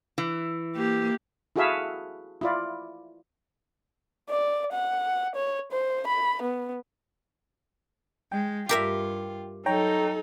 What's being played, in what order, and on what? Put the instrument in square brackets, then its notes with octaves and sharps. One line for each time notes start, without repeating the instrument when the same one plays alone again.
[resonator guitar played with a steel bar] E3
[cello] A#3 [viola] G4
[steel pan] E4 F#4 G#4 A4 E5 F5
E4 F4 D5
[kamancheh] D5
F#5
C#5
C5
B5
B3
[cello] G#3 [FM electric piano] G5
[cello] G2 F4 [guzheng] G4 A#4 E5
[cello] F#3 [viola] D#4 A4 [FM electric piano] C#5 G5 A#5